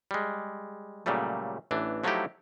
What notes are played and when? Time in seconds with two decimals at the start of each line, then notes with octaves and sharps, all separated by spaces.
0.11 G3 G#3
1.06 A#2 C#3 F#3 G3 A3
1.71 A1 E3 D4
2.04 F3 F#3 A3 D#4 E4 G4